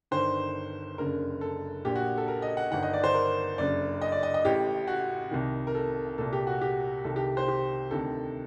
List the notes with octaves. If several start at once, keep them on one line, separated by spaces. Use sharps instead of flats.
G1 G2 D#3 C5
F#1 F#2 D3 A#4
A4
A#1 A#2 G4
F#4
A4
A#4
D#5
F#5
G1 G2 D#3 F#5
D#5
D5
C5
A#4
F#1 F#2 D3 D5
D#5
D5
D#5
D#5
A1 A2 G4
F#4
C2 C3 D#3
A#4
A4
C2 A#2 A4
G4
F#4
G4
C2 C3 D#3 A4
G4
C5
G4
D2 C3 D#3 A4